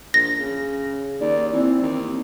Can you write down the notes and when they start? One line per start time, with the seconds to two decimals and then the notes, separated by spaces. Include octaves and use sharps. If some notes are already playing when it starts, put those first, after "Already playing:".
0.14 A#1 A#6
0.39 C#3
1.20 D#2 D5
1.53 E3 C4
1.82 D#2